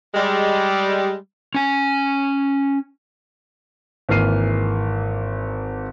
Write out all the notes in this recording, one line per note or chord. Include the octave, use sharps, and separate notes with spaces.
G3 G#3
C#4 G#5
G#1 E3 A#3 F6 C7 D#7